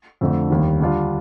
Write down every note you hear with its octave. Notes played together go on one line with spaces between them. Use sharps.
F2 D3 A3 D4
D#2 D#3 G3
D3 G3 D4 F4